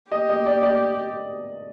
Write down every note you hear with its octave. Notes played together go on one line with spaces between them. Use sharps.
G4 D#5
D#5
D5
D5